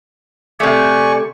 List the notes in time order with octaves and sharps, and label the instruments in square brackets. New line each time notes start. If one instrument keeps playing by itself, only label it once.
[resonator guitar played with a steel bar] C3 A3 [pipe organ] D5 G#5 C#6